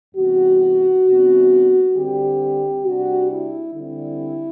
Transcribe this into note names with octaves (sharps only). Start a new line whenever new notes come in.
E2 C3 G3 F#4
E2 C3 G3 B3 D4
D3 G3 C4 G4
C3 G3 D4 F#4
E4
D3 G3 C4 E4